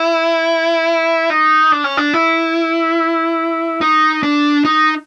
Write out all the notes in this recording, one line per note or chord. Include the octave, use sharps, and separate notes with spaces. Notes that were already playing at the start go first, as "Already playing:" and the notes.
Already playing: E4
D#4
D4
C#4
D4
E4
D#4
D4
D#4